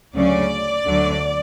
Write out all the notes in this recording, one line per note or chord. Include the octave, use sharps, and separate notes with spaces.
D2 C#3 F#3 C#4 D5
D2 D3 F#3